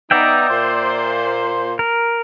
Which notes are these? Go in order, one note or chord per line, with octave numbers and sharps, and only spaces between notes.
B3 D#4 D5 E5 G5
A#2 C5
A#4